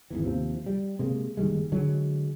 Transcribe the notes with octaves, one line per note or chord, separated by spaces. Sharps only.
G#1 E2 E3
D#2 C3 F3
G3
C3 G#3 A#3
F#1 D#3 G3 G#3
D3 F#3 G#3